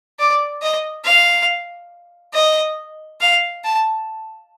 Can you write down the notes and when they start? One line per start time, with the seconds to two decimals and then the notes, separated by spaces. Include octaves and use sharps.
0.19 D5
0.62 D#5
1.05 F5
2.34 D#5
3.21 F5
3.64 A5